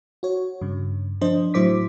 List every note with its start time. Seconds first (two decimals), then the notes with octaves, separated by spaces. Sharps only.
0.23 F#4 C#5
0.61 G2 C#3
1.21 F3 D4 C5 D#5
1.54 A2 F#3 E4 C5 D6 B6